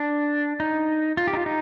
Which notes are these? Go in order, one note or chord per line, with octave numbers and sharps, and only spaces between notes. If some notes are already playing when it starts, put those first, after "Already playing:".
Already playing: D4
D#4
F4
G4
D#4
F4
D#4